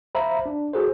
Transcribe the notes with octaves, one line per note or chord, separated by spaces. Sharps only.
C5 E5 F5 A#5 B5
D4
F#4 G#4 A4 C5